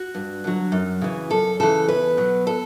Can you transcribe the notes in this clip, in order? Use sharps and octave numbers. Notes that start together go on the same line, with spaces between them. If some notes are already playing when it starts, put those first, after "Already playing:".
Already playing: F#4
G2
D3 F#3
F#2
C#3 E3
F#2 A4
C#3 E3 A4
E2 B4
B2 F#3
A4